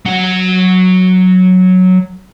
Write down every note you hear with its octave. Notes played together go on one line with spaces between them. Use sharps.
F#3 F#5